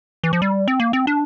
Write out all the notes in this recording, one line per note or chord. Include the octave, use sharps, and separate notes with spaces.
E3
F3
G3
C4
A#3
C4
D4